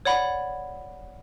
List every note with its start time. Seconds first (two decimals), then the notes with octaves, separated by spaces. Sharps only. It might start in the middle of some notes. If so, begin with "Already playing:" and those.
0.05 C#5 D5 F#5 B5